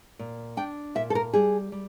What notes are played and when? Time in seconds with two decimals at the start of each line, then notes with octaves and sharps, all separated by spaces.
0.19 A#2
0.57 D4 G5
0.95 A#2 E5
1.10 A4
1.15 A#4
1.34 G3 G#4
1.72 G3